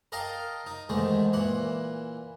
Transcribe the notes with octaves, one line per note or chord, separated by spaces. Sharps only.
A#4 D#5 F5 G5 A5 A#5
D#4
E2 G#2 D#3 G#3 A3
A#2 E3 F#5